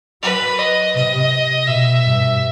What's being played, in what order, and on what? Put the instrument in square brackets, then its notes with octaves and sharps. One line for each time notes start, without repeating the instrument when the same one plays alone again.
[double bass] F#3 [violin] B4
[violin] D#5
[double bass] C3 [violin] D#5
[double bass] B2 [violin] E5
[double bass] G2